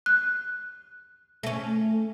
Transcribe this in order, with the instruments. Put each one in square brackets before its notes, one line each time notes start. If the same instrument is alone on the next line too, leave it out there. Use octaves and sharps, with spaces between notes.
[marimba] F#6
[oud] A3 C#4